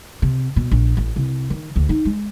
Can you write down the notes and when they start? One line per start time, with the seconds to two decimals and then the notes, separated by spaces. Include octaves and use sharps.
0.22 C3
0.56 B2
0.71 A#1
0.97 A1
1.16 C2
1.50 D#3
1.76 D2
1.89 D#4
2.05 G#3